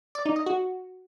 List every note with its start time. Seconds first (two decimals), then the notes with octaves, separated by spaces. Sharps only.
0.15 D5
0.26 D#4
0.36 D#5
0.46 F#4